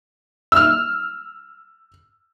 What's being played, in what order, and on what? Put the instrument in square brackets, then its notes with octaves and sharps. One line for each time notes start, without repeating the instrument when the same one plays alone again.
[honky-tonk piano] E6 F6